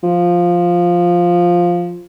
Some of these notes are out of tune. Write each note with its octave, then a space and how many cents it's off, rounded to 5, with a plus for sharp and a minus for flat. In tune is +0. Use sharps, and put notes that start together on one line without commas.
F3 +5